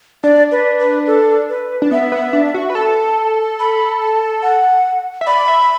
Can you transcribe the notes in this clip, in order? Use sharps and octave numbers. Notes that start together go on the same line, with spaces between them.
D4 D5
B4
B4
A4
B4
D4
B3 E5
B3
D4
F#4
B4
A4 A5
B5
A5
F#5
E5
D5 B5
E5